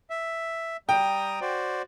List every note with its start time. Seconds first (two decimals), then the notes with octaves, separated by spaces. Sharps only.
0.10 E5
0.89 G3 G5 A#5 D#6
1.41 F#4 C5 D5